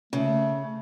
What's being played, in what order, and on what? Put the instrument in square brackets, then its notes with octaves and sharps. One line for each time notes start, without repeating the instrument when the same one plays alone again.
[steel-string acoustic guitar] C#3 [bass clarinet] A3